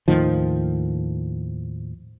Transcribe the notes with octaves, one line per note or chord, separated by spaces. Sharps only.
D#2 A2 D#3 F3